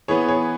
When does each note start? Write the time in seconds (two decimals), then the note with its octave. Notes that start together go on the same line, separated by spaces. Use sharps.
0.08 E3 B3 G#4 C#5
0.28 G#4 C#5